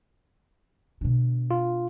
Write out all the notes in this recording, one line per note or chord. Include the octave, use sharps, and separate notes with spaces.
B2 D3
F4